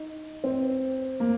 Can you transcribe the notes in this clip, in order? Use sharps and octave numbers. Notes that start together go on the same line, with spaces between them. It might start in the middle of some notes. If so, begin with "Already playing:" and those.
Already playing: D#4
C4
A#3